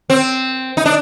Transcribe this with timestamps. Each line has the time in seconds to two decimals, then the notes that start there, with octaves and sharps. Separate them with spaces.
0.10 C4
0.77 D#4
0.86 D4